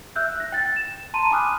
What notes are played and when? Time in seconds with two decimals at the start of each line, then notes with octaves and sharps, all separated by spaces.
0.16 E5 E6 F#6 G6
0.36 F#6 A#6
0.52 G5 A6
0.76 E7
1.14 A5 A#5 C6 D#7
1.31 G#5 B5 D6 D#6 F6 F#6